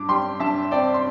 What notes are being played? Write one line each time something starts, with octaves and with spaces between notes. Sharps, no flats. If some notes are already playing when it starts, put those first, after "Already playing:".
Already playing: G2 D6
G3 G5 C6
G2 E5 A5
C4 D5 G5
C6